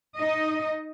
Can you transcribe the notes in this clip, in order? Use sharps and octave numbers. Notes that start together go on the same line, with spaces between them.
D#4 D#5